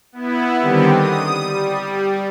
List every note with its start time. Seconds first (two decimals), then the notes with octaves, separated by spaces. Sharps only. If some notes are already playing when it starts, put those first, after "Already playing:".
0.12 B3 E4
0.59 D3 D#3 G3 B3 C4 G4
0.92 D#6
1.42 G3